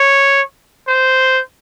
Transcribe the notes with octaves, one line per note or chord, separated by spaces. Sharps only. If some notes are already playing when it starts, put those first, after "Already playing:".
Already playing: C#5
C5